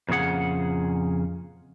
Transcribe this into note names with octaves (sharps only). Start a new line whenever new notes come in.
F2 A#2 C#3 G#4 F#5